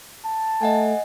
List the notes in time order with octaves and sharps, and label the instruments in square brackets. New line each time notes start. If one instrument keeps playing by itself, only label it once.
[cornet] A5
[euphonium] A3 [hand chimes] D#5 F#5 G#5